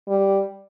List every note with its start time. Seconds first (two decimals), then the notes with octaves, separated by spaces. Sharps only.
0.08 G3